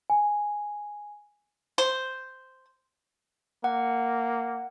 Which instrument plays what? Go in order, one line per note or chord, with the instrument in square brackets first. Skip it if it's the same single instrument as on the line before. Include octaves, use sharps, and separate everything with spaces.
[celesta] G#5
[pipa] C5
[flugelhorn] A#3 [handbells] F#5